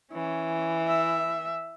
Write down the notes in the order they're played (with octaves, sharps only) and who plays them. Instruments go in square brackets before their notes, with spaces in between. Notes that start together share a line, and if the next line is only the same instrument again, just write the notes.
[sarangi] E3 [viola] C#4
[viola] E5